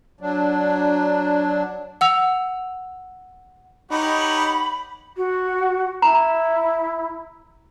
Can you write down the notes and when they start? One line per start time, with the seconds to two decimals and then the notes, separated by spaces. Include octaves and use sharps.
0.21 F#3 D4
2.01 F#5 E6 F7
3.91 D#4 G4 C#5 F#5 B5
5.16 F#4
6.02 E4 A#5